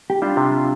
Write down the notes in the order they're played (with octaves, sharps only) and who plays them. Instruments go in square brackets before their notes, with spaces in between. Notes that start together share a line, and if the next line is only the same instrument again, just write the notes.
[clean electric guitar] G4
[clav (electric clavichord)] G3 [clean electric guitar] D4 F4
[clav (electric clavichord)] C3
G3